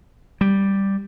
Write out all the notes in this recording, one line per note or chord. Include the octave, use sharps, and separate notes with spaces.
G3